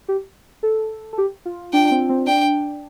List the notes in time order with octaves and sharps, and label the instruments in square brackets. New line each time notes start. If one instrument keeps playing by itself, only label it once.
[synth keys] G4
A4
A4
G4
F4
[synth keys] D4 [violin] G5
[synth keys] D4
C4
C4
[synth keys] D4 [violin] G5